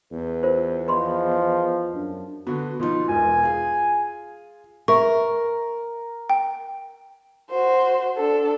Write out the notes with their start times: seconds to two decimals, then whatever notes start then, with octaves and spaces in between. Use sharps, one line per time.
0.11 E2 B4
0.43 F4 A#4 C5
0.88 F3 B4 D#5 B5 C6
1.94 F#2 D4
2.47 D3 B3 F#4
2.80 B2 F3 D#4 F4
3.08 E1 E2 G#5
3.43 F4 G#4
4.88 A#4 E5 C#6
6.30 G5
7.50 F#4 C5
8.17 D4 A4